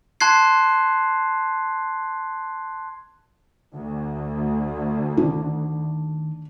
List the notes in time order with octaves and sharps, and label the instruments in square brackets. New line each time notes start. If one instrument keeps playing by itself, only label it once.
[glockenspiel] A5 C6 F#6 G#6 C7
[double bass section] D2
[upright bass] D#3 [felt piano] D4